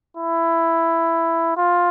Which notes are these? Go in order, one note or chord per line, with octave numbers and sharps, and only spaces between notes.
E4
F4